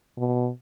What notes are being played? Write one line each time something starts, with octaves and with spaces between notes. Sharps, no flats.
B2